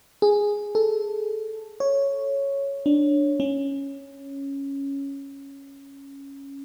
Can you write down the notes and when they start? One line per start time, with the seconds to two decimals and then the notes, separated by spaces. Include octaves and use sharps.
0.22 G#4
0.75 A4
1.80 C#5
2.86 D4
3.40 C#4